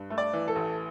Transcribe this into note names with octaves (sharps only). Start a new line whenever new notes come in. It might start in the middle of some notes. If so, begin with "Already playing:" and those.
Already playing: G2
A3
D5
E3
A4
A1